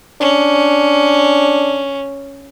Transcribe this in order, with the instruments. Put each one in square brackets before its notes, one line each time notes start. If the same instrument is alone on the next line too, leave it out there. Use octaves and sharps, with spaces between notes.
[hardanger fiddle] C#4 [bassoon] D4